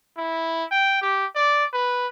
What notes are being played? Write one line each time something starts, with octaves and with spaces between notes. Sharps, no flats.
E4
G5
G4
D5
B4